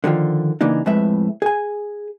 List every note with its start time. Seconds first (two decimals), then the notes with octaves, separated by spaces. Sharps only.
0.04 D3 D#3 F3 F4
0.61 C#3 E3 A#3 D4 D#4
0.86 F2 A2 G#3 B4 E5
1.42 G#4 G#5